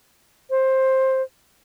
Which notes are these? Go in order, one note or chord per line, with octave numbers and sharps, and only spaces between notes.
C5